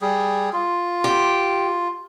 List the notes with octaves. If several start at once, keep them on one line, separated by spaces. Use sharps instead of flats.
G3 G#4
F4
G4